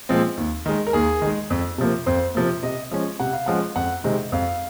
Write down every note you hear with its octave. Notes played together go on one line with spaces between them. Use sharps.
A#2 F3 G#3 C4
D#2
D#3 G#3
A#4
D#2 G#4
D#3 G#3
F2
C3 F3 A#3
F2 C5
C3 F3 A#3
C3 D#5
F3 G#3 C#4
C3 F#5
F5
F3 G#3 C#4 F#5
F2 F#5
C3 D#3 G#3 C4
F2 F5